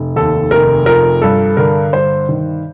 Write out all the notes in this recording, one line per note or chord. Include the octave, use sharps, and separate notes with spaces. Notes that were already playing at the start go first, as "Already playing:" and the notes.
Already playing: F1
D#2 A4
F1 A#4
F3 A#4
G2 A4
D3 A#4
G2 C5
D#3